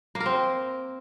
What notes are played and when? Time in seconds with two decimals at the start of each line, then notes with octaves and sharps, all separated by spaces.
0.15 A#3
0.20 A#4
0.26 C4